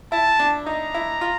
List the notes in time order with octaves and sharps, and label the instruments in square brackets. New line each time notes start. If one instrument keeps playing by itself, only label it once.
[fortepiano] E4 [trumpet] A5
[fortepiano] D4
[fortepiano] D#4 [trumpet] A#5
[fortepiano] E4
F4